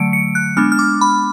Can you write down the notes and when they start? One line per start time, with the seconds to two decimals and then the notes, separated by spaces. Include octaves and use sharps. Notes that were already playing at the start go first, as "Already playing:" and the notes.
Already playing: D3 F#3 A3 C#7 D7
0.13 C#7
0.35 F#6
0.57 G#3 B3 D4 F6
0.72 F6
0.79 D6
1.01 B5